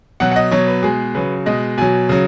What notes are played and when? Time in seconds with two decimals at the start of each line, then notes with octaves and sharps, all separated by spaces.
0.20 B2 F#3 F#5
0.32 F#5
0.36 D#5
0.51 B2 F#3 C#5
0.67 B4
0.83 B2 G#3 G#4
1.15 C#3 F#3 B4
1.46 B2 G#3 D#5
1.77 B2 F#3 G#5
2.09 C#3 F#3